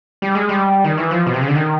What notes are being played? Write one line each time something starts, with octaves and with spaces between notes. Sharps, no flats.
G3
G#3
G3
D#3
E3
F3
B2
C3
C#3
D3
D#3